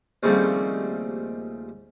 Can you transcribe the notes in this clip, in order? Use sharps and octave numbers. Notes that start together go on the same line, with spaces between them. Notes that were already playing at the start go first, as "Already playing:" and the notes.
D#2 C#3 F3 G3 A3 C4